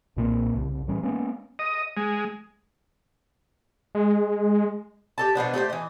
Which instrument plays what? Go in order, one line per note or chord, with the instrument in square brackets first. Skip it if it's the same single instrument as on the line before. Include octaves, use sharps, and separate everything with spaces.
[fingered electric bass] B1 A#2 A#3 C4
C2 C#3
A2 E3 G3 C#4
G#3 A#3 B3 C#4
[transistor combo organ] D#5
G#3
[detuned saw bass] G#3
[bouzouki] G4 A4 A5
B2 F3 B3 D4
A3 G4 G#4 C5
E3 D#5